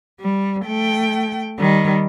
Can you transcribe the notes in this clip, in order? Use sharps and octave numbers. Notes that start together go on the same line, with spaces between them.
G3
A3 G5
D#3 G3